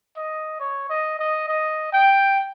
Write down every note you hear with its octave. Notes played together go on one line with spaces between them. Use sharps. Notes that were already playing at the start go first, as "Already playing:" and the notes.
D#5
C#5
D#5
D#5
D#5
G5